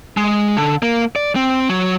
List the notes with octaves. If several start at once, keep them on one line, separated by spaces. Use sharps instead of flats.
G#3
D3
A#3
D5
C4
F#3